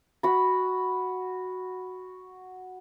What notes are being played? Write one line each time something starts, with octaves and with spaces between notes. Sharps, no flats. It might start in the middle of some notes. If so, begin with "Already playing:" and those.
F#4 B5